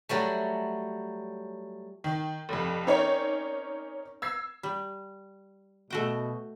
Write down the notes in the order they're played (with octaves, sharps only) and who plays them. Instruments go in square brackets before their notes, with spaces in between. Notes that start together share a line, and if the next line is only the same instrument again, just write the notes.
[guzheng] F#3 G3 A3
[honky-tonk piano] D#3
F1 F2
C4 C#4 D#4 A#4 C#5 D5
E6 G#6 C7
[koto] G3
[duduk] B2 [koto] A3 F#4 G5